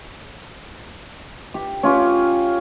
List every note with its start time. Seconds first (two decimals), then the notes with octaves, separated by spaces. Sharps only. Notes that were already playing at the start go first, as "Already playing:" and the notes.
1.54 G4
1.83 C#4 F4 G4